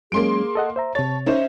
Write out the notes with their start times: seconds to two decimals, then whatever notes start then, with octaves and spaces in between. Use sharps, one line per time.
0.12 F#3 G#3 A#3 C#4 G#4 C6 D7
0.55 A4 D#5 F#5
0.76 C5 E5 A#5
0.95 C3 C#5 A5 A6
1.26 C#4 D#4 C5 E5